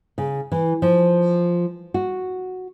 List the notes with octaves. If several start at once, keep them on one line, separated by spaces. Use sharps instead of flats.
C#3
E3
F3
F#4